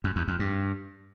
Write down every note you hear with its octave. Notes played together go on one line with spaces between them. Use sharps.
F#2
E2
F2
G2